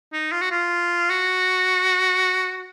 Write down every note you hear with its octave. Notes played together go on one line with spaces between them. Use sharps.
D#4
F4
F#4
F4
F#4